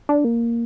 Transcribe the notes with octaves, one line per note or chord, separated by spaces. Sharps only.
D4
A#3